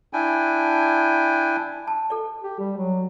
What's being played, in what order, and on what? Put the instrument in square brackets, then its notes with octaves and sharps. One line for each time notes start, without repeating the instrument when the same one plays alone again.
[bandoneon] D4 E4 G5 G#5
[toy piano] A5
A4 D5
[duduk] G4
G3
F#3